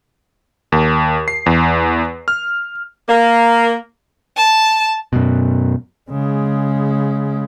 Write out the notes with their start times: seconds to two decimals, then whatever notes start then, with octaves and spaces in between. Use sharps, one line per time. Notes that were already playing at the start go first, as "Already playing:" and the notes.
0.72 D#2
1.28 C7
1.46 E2
2.28 F6
3.08 A#3
4.37 A5
5.13 F#2 B2
6.11 C#3 G#3